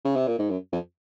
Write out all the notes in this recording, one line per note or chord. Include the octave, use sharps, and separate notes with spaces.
C#3
C3
A#2
G#2
F#2
F2